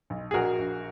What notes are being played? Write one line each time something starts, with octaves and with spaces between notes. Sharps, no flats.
B1
G#4
A#1 F#4 A#4
A#1